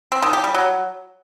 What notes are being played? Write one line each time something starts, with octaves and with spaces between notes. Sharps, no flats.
C4
D#3
G4
G3
F#3